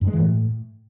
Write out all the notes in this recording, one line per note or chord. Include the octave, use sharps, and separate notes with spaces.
G2
G#3
E3
A2